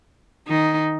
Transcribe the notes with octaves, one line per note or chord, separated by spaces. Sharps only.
D#3 D#4